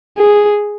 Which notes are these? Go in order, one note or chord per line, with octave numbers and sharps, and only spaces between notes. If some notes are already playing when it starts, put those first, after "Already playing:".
G#4